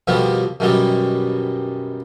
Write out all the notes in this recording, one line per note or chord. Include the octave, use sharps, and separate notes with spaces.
F2 B2 D#3 F3 G3 B3
F#2 B2 D#3 F#3 G3